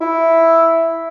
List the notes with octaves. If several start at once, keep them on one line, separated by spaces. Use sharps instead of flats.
E4